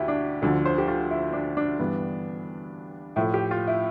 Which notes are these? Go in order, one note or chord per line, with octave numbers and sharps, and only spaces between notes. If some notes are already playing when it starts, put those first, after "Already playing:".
Already playing: D2 E4 G4
D4
D2 D3 F3 A3 A4
C5
G4
F4
E4
D4
D4
G2 E3 G3 B3
A2 F3 A3 E4
G4
F4
E4